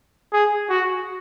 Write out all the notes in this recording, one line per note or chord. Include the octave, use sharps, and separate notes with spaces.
G#4
F#4